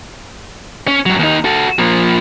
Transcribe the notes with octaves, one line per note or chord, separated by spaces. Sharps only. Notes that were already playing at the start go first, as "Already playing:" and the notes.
C#4
G2 F#3
D#2 D#4
F#4 A4
F3 A#3